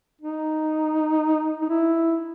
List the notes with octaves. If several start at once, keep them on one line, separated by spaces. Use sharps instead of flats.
D#4
D#4
E4